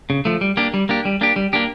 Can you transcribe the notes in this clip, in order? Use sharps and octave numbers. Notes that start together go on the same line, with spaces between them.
C#3
F3 A3
G3
A#3 D4 G4
G3
A#3 D4 G4
G3
A#3 D4 G4
G3
A#3 D4 G4